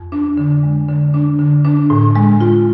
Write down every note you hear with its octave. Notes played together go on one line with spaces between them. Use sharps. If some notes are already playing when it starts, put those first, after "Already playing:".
Already playing: F2
D4
D3
G#3
D3
D4
D3
D4
A2
G#3
F4